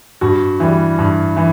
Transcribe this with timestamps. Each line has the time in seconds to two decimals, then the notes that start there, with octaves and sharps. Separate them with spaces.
0.21 G2 F#4
0.60 E3 G3
0.98 G2
1.37 E3